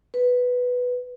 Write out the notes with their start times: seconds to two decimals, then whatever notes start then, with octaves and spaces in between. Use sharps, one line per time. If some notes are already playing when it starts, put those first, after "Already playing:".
0.14 B4